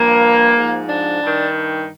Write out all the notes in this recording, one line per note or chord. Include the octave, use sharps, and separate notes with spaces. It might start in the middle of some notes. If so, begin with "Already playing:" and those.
Already playing: G2 F3 A#3
G#2 F3
D4
G2 D#3